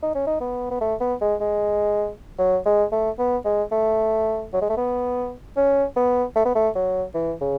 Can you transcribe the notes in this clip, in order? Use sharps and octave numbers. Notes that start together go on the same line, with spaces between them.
D#4
C#4
D#4
B3
B3
A3
B3
G#3
G#3
F#3
G#3
A3
B3
G#3
A3
F#3
G#3
A3
B3
C#4
B3
A3
B3
A3
F#3
E3
C#3